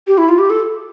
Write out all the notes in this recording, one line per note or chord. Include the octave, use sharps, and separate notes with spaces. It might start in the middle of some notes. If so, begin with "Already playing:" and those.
G4
E4
F4
G4
A4